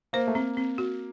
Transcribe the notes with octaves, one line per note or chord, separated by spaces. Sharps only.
A#3 C5
A3
A#3 C4
C4
F#4